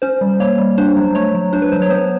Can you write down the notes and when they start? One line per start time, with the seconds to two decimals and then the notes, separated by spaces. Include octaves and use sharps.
0.02 C#4 C5
0.21 G3
0.40 A#3 C#5
0.58 G3
0.78 D4 C5
0.97 F#3
1.15 A3 C#5
1.35 F#3
1.53 D4 C5
1.62 B4
1.72 F#3 C5
1.82 C#5
1.90 B3 C5